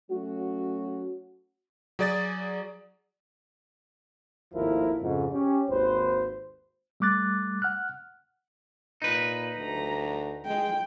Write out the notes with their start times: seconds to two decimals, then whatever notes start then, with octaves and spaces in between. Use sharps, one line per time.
0.10 F#3 A3 C#4 F#4
1.99 F#3 G#4 D5 D#6 A6
4.54 G#1 D#2 A2 F3 E4 A#4
5.01 F2 G#2 C#3
5.32 C#4 G4
5.69 G#1 D#2 B4 C5
7.00 G3 A3 D6 F#6 A6
7.62 F#5 F6 F#6
9.02 A#2 D#4 B4
9.57 D2 A#5
10.46 G#3 G5